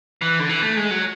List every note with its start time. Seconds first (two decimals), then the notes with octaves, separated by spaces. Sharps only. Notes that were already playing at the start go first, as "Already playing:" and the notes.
0.21 E3
0.40 D3
0.49 E3
0.63 A3
0.77 G#3
0.91 F#3